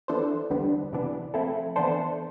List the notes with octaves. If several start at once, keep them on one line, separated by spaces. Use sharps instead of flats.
E3 B3 D4 A4 C5
E2 D3 G3 B3 D4
C3 E3 B3 D4
F3 A3 C4 E4 A4
E3 B3 D4 A4 C5